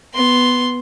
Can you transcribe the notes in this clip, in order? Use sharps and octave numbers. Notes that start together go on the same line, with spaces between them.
B3 C6